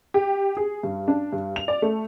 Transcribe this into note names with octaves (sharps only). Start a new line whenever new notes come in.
G4
G#4
G2
D4
G2
F7
D5
A3